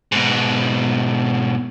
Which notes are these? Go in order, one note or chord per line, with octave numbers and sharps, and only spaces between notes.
G#2 B2